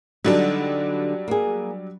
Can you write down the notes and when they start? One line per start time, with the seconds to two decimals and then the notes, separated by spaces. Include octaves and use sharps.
0.25 D3 F#3 G3 D4 D#4
1.28 A#3 G#4